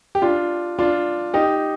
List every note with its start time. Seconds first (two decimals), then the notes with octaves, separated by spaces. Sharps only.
0.15 G4
0.22 D4 F4
0.79 D4 F4
1.34 D#4 G4